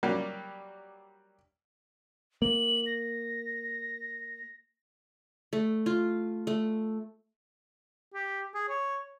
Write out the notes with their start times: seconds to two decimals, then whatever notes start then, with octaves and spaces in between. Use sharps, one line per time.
0.03 F#3 G3 A#3 G4
2.42 A#3 F#7
2.86 A#6
5.53 A3
5.86 F4
6.47 A3
8.14 G4
8.54 G#4
8.69 C#5